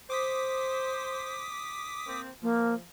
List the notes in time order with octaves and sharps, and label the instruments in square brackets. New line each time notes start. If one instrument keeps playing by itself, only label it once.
[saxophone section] C5 [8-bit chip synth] D6 D#6 B6
[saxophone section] A#3 C4
[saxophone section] F3 [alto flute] A#3